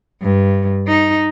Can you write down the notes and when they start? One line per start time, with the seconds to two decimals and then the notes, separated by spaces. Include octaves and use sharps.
0.22 G2
0.88 D#4